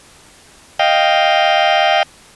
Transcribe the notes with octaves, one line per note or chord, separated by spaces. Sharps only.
D#5 F5 G5